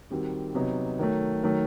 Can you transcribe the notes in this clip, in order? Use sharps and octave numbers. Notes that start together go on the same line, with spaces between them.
D#3 G3 C4 F#4
C3 F#3 B3 D#4
D#3 F#3 A3
D#3 F#3 A3